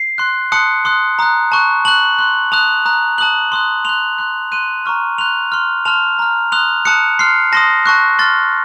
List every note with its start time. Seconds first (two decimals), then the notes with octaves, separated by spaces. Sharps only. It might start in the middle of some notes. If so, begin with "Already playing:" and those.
Already playing: C7
0.18 C6 F#6
0.52 A5 C6 D#6 F#6 C#7
0.85 C6 D#6 F#6
1.19 A#5 D#6 F#6
1.52 A5 C#6 F#6
1.85 A5 C#6 F#6 F#7
2.19 C6 F#6
2.52 A5 D#6 F#6 F7
2.86 A#5 D#6 F#6
3.18 A5 D#6 F#6 F#7
3.52 C6 D#6 F#6
3.85 C6 F#6 F7
4.18 C6 F#6
4.52 C6 F#6 D#7
4.86 A#5 C#6 F6
5.18 C6 F#6 F7
5.52 C6 F6
5.85 A5 C6 F6 F7
6.19 A#5 F6
6.52 C6 D#6 F#6 F7
6.85 A5 D#6 F#6 C#7
7.19 C6 F6 C7
7.52 A5 C6 D#6 A#6
7.86 A5 C#6 F#6
8.19 C6 F6 A6